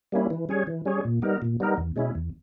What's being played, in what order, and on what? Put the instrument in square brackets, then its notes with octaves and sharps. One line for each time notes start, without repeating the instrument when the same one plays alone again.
[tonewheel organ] G3 A#3 C#4 E4
E3
G3 C#4 G#4 C#5
E3
G3 C#4 G#4 C#5
A#2
G3 B3 D#4 A#4
A#2
G3 B3 D#4 A#4
E2
B2 G#3 C#4 E4
E2